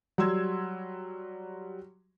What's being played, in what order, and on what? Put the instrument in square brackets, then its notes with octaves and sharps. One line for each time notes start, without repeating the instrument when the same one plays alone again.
[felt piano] F#3 G3 C6 E6 G#6